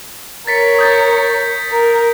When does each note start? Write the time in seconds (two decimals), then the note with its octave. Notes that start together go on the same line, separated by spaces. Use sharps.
0.47 A#4 C#5 A6 B6 C#7
0.79 D#6 G6 A6
1.71 A#4